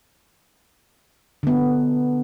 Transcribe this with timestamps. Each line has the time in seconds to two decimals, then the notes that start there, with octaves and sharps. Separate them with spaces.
1.43 D3 B3